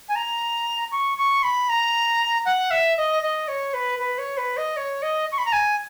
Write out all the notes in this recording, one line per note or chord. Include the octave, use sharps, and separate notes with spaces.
G#5
A#5
C#6
C#6
B5
A#5
F#5
E5
D#5
D#5
C#5
B4
B4
C#5
B4
D#5
C#5
D#5
C#6
B5
A#5
G#5